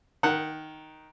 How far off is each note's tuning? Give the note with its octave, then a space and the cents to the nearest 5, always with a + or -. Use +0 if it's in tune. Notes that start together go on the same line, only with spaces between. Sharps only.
D#3 +0 F#5 +0